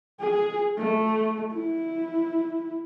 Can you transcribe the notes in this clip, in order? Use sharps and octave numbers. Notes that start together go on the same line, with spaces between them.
G#4
A3
E4